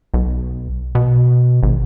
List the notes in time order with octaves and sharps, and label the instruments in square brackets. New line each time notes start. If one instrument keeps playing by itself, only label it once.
[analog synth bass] B1
B2
G#1